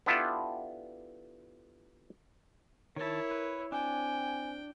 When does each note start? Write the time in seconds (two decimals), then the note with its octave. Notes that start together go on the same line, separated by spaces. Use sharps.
0.06 B3 D4 E4 F4 G4 A4
2.96 D#3 E4 A#4 C#5 A5
3.31 B4
3.72 C4 D4 G5 G#5